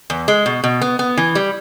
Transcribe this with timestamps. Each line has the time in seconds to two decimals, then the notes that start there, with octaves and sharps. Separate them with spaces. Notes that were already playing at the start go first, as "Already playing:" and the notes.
0.10 E2
0.28 G#3
0.46 B2
0.64 B2
0.81 B3
0.99 B3
1.17 E3
1.35 G3